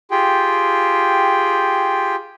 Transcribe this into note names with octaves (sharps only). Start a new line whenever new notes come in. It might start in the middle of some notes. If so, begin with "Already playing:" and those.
F4 G4 G#4 G5